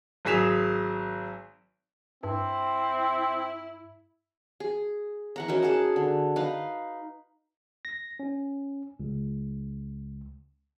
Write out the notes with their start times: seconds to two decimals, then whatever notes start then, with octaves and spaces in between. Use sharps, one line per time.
0.25 G#1 F#3 G#4 B6 E7 F7
2.23 G2 C4 E4
4.60 G#4
5.36 E3 F#5 A#5
5.48 C#4 D#4 F#4 A#4
5.63 G#4 F#5 A5
5.96 D3
6.36 D#4 B4 F5
7.85 A#6
8.20 C#4
9.00 C#2